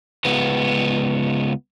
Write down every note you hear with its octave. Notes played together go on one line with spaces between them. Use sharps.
C#2 B3